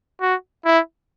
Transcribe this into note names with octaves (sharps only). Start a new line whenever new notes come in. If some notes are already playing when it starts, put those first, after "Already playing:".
F#4
E4